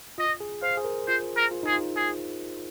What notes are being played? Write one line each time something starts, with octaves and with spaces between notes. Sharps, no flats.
F4 D#5
G#4
C5 F5
G#4
A#4
F4 C5
A#4
F4
D#4 G#4
F4
G#4